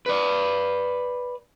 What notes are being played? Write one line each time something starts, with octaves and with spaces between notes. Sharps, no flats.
B4 D5